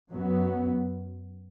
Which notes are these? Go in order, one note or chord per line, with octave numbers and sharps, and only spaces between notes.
F#2 F#3 B3